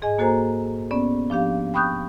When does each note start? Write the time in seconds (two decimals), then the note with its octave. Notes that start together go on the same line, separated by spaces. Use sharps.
0.02 G#2 G#4 D#5 G#5
0.18 A#3 F#4 A4 C5 G#5 A#5
0.91 B3 C#4 D5
1.30 F3 D4 G4 F5
1.74 G5 B5 C#6 D#6 F#6 G6